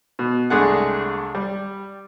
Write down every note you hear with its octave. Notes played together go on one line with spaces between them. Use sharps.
B2
C2 G#3 A3 D4 G#4 F#5
G3